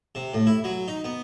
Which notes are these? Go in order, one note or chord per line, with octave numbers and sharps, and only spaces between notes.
C3
A2
E4
F#3
D#4
B3